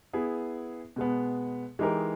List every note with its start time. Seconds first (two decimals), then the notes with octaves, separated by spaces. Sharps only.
0.13 B3 E4 G#4
0.96 B2 G#3 B3
1.79 E3 G#3 D#4 G4 A#4